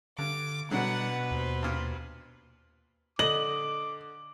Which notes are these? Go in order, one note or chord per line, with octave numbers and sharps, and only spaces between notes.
G2 D3 D6
B2 D3 F#3 G3 D4 B4 F#5
D#2 C5
G2 A#2
D3 D#5 D6 F#7